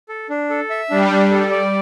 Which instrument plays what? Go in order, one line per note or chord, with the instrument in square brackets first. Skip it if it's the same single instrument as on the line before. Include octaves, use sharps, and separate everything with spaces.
[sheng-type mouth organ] A4
D4
A4
E5
[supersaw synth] G3 [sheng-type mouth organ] D4
[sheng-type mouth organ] D4
A4
D5